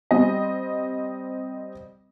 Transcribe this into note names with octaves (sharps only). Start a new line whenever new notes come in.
G3 C4 D#5